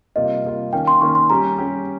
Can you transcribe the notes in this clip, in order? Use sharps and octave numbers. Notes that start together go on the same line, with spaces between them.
C3 G3 A#3 F4 D#5
C3 G3 A#3 F4
D#3 A#3 C#4 G5
C6
D#3 A#3 C#4 C#6
C6
G3 C#4 G4 A#5
G3 C#4 G4